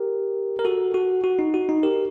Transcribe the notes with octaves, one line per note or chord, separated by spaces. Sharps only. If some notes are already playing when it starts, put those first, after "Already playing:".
Already playing: G4 A#4
A#4
F#4 A4
F#4
F#4
D#4
F#4
D#4
G4 A#4